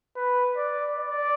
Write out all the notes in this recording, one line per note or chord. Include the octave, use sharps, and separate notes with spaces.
B4
D5
D5